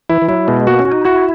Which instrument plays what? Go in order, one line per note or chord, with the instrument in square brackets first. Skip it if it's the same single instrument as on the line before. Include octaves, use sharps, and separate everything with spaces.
[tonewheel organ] E3 [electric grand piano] E4
[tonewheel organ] E3
[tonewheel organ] F#3 [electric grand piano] E4
[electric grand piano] B2 [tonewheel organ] G#3
[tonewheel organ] A#3 [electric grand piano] F#4
[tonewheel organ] C#4
[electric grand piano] F#4
[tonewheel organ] D#4
[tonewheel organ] E4 [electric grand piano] F#4